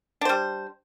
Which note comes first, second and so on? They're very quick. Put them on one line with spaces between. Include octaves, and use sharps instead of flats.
D4 C5 G3